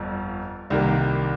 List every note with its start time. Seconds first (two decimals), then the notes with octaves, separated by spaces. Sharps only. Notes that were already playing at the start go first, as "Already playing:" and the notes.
Already playing: G1 F2
0.70 C2 C3 D#3 A#3